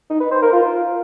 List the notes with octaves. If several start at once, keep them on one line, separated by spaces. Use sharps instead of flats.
D#4
B4
C5
A#4
F4